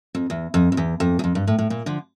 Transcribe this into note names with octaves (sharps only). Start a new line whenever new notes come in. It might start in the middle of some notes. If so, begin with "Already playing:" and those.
F2
E2
F2
F2
E2
F2
E2
F2
G2
A2
A2
A#2
D3 F3